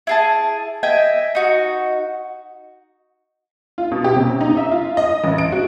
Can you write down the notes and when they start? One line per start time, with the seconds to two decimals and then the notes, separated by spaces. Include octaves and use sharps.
0.07 E4 G#4 A5
0.83 D#5 E5 G5 G#5
1.35 D#4 F#4
3.78 F4
3.92 B2
4.04 G4
4.16 C3
4.29 C#4
4.41 D#4
4.57 E5
4.71 F4
4.97 D#5
5.24 A1
5.38 D7
5.52 F#4